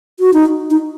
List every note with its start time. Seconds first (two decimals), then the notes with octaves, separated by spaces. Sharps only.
0.20 F#4
0.33 D#4
0.70 D#4